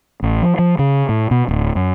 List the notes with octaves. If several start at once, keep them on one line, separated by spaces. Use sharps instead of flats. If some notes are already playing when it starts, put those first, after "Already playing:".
A1
F3
F3
C#3
A2
B2
D1
F#2